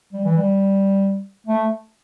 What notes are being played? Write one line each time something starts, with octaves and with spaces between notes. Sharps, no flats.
G3
E3
G3
A3